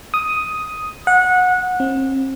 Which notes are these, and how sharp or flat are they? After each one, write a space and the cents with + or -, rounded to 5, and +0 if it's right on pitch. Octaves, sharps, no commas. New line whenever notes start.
D#6 +5
F#5 -20
C4 +35